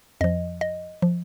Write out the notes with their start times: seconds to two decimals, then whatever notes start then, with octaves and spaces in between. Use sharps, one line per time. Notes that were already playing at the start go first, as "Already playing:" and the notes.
0.21 F2 F3 D#5
0.61 D#5
1.02 F3